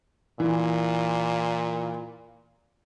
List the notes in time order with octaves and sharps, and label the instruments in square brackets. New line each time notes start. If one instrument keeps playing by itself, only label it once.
[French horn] A#2 [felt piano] E3